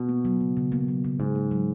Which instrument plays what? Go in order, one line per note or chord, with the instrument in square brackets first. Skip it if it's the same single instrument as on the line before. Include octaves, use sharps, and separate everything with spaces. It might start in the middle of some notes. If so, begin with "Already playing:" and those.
Already playing: [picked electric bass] B2
[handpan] A#3
F#3
C#3
C#3
A#3
F#3
C#3
[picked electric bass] G#2 [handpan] C#3
[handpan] A#3
F#3